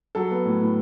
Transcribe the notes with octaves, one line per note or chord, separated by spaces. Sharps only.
F#3 A4
B3
A2
A2